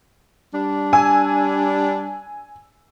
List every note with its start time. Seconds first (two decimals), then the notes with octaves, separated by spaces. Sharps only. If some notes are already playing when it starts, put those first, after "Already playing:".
0.53 G3 D4
0.93 G#5 E6